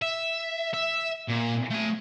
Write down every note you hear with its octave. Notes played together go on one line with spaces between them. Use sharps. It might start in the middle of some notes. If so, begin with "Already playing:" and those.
E5
E5
A#2
A3 G#5